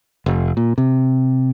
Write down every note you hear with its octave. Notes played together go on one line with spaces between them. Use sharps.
F1
A#2
C3